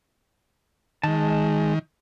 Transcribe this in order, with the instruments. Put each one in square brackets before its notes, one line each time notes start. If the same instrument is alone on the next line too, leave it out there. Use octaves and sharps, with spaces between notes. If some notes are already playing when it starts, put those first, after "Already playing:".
[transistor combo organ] D#3 [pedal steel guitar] G#3 A5